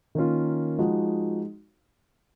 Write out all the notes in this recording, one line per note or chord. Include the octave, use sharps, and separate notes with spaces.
D#3 A#3 C#4 F4
F3 G#3 D#4 F#4